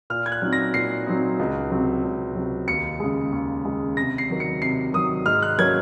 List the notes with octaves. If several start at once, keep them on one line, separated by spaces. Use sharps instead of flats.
A#2 F6
G#6
F#6
F#3 C4 D#4
A#6
A#2 C7
F#3 C4 D#4
C#2
C3 F#3 C4
C#2
C3 F#3 C4
D#2 C#7
C#3 G#3
D#2
C#3 G#3
C3 A#6
C7
D#3 F#3
C#7
C3 C7
D#3 F#3 D#6
G#2 F6
F#6
F#3 A#3 C#4 G#6